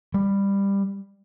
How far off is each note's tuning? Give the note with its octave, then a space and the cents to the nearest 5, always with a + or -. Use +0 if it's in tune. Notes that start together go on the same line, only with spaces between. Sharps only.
G3 +15